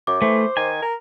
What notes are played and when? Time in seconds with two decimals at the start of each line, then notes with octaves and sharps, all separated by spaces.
0.07 F#2 D6
0.22 E3 A3 C5
0.57 D#3 G#5
0.82 A#4